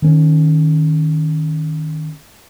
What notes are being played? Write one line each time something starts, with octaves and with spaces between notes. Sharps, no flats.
D#3 C#4